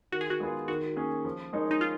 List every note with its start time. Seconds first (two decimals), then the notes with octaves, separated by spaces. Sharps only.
0.12 D#3 F#4
0.21 G#4
0.30 F#4
0.40 G#3 B3 F4 G#4
0.68 D#3 F#4
0.96 A#3 C#4 G#4
1.25 F3
1.53 G#3 D#4 A#4 C#5
1.71 D#4
1.81 F4